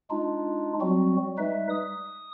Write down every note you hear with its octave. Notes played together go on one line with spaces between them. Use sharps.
G#3 D4 D#4 F4
F#3 G3 C4 F#4
G3 G#3 D#4 B4 E5
D#6